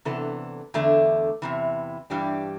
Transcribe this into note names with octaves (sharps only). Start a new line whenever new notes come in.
C3 E3 B3 D4 A4
E2 D3 A3 D4
E2 C3 E3
G2 E3 G3 D4 G4